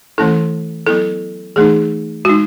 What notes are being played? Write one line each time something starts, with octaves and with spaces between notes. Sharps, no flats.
E3 A3 C#4 E4 A4
F#3 B3 E4 A4
E3 A3 D#4 G#4
G#3 D#4 F#4